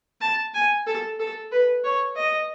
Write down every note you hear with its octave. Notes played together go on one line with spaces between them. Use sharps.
A5
G#5
A4
A4
B4
C#5
D#5